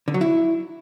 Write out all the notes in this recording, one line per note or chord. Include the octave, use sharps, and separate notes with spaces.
D3
F#3
E4